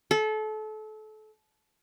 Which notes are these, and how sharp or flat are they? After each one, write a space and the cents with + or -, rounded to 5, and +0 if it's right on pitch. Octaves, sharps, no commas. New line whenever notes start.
A4 -30